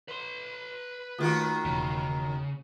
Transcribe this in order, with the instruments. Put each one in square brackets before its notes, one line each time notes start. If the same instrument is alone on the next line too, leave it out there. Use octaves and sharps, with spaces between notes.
[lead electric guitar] B4 C6
[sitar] D#2 D#3 F#4 [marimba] A3 F4 G#4
[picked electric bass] E1 E2 [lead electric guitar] C#3